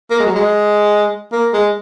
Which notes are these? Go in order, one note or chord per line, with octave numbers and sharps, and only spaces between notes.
A#3
G#3
F#3
G#3
A#3
G#3